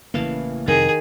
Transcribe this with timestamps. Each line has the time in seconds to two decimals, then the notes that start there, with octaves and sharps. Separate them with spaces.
0.14 A1 C#3 E3 A#3 F5 A5
0.68 F2 C3 D#3 G#4